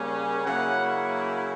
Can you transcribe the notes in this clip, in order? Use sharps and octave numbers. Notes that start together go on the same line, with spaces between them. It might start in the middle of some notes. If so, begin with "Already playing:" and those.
Already playing: C#3 G3 A#3 C#4
C#3 F#3 A#3 C#4 E4 F#5